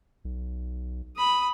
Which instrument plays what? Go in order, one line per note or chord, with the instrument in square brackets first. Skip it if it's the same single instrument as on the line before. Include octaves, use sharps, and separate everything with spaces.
[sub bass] B1
[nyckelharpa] B5 D#6